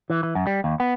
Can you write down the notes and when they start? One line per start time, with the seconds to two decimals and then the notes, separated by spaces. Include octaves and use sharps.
0.10 E3
0.23 E3
0.35 F#2
0.47 G3
0.64 D#2
0.80 B3